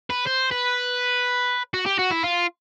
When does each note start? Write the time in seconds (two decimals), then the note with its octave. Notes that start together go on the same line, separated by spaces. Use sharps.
0.10 B4
0.26 C5
0.51 B4
1.74 F#4
1.86 G4
1.99 F#4
2.11 E4
2.23 F4